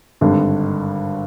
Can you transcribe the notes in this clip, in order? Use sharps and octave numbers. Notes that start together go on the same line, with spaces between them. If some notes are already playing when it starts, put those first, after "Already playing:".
G#1 G2 D3